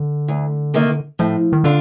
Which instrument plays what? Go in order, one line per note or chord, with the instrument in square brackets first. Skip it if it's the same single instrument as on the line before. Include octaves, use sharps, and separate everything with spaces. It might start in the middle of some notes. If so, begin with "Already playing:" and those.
Already playing: [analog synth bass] D3
[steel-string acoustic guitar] D2
C3 D#3 A#3
[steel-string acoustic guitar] A2 [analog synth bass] F3
[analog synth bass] D#3
[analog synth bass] D3 [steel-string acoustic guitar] D4 F4